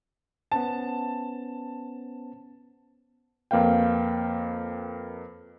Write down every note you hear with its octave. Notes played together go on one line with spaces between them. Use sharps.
B3 C#4 C5 A5
F2 A#3 B4 F5 G5